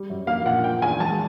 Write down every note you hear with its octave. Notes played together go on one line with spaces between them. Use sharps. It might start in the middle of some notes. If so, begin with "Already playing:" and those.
Already playing: G3
F#2
A#3 F5
A#2 F#5
F3 G5
E2 G#5
G#3 A5